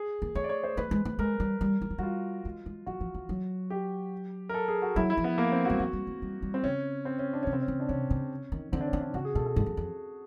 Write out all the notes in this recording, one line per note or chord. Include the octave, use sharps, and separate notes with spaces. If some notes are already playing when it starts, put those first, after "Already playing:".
Already playing: G#4
A#3
A3 C#5
D5
C#5
C5
A3 B4
G#3
A3
G#3 A#4
G3
G3
G3
F#3
G3 F4 F#4
G#3
G#3
F#3 F#4
F3
E3
F#3
G4
A#4
A4
G#4
F#4
F#3 E4
E4
F3
B3
A#3
C4
G3 F#4
F#3 F#4
G3
A3
G3
G3
C4
C#3 C#4
C4
C#4
D4
C3 C#4
C4
C#4
C#3
D4
C3 C#4
C#3
D#3
D3 C4
D4
C#4
D3
D4
C#3 F#4
G#4
B2 A4
A4
G#2
F#2
F2